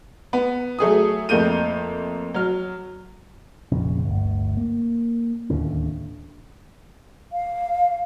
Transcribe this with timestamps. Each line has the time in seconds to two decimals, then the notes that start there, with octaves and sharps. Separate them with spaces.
0.33 B3
0.79 F#3 A3 G#4 D#6
1.29 F2 A3 A#3 G6 D#7
2.34 F#3 F6
3.72 F1 A#1 C#3 C#4
4.05 G1 D2
4.57 A#3
5.50 D1 D#2 D3 C#4
7.33 F5